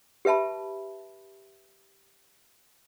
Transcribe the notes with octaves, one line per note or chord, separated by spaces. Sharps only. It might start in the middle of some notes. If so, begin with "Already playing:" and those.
G4 B4 E5 A5 B5